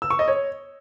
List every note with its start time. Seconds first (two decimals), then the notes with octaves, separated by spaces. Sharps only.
0.02 E6
0.10 C#6
0.19 D#5
0.28 C#5